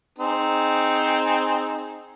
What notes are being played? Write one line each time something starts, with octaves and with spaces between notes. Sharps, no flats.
C4 D#4 G#4